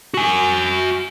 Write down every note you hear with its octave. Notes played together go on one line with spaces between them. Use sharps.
F#4 G#5